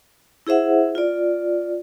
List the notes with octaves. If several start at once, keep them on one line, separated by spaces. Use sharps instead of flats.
E4 G#4 C5 E5 F#5
F4 D5